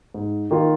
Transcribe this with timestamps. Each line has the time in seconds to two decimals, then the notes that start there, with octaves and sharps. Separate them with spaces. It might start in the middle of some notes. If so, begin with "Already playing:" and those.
0.14 G#2
0.51 D#3 A#3 F4 A#4